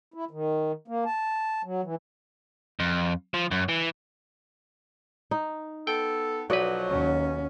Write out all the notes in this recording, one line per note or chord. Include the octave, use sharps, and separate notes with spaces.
E4
D#3
A#3
A5
F#3
E3
F2
F3
F#2
E3
D#4
B3 A4 G5
B1 F3 F#3 F#4 B4 D5 D#5
D#2 C#4